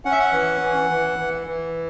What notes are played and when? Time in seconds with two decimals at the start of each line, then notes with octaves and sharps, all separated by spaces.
0.05 C#4 F#5
0.11 E5
0.20 F#5
0.32 E3
0.61 E3
0.90 E3
1.18 E3
1.47 E3